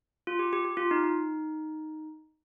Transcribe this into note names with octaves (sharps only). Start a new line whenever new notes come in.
F4
G4
G4
G4
F4
D#4
D#4